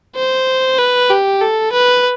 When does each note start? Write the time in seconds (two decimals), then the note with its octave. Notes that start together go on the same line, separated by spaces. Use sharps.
0.16 C5
0.78 B4
1.10 G4
1.41 A4
1.72 B4